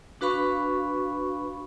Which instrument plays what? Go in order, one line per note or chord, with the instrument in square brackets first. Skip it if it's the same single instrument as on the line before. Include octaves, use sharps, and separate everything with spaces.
[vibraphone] D4 F#4 B4 F5 B5 C#6